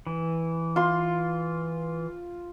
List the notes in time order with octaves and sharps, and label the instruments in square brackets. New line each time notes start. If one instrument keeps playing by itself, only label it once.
[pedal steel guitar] E3
[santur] F4 C6